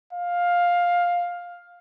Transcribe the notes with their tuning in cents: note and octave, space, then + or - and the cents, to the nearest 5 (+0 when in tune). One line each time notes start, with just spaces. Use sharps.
F5 +10